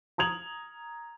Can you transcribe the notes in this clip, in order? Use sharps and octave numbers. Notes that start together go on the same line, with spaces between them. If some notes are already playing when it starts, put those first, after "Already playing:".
A#5 D#6 G#6 F7 F#7